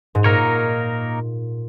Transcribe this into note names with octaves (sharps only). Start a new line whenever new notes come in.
G#2
A#2 A#3 D#4 A#4 C#5